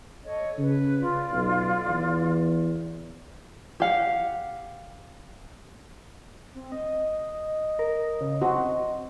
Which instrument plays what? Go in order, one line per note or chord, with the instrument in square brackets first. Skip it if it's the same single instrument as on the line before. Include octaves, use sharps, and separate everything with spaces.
[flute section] A4 C#5 D#5
[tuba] C#3 [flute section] B4
[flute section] F4 D5
[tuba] B1
E2
[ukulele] G4 F5 F#5
[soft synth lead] C4
D#5
[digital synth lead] A#4
C#3
[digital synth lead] C4 [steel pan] F#4